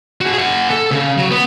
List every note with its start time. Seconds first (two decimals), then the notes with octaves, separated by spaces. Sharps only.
0.21 F#4 G#4
0.33 G#4 F#5
0.70 A4
0.91 C#3
1.17 F#3
1.31 B3